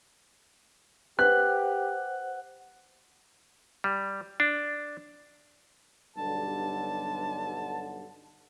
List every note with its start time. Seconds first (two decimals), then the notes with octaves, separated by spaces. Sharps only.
1.19 G4 B4 C5 F#5 F#6
3.84 G3
4.40 D4
6.16 B1 G2 D3 A5